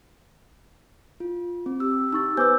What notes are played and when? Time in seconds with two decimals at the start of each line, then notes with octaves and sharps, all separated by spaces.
1.20 F4
1.66 C4
1.80 G4 E6
2.13 D#4 C#6 E6 A6
2.37 B3 B4 C5 G#5 D6 E6 G6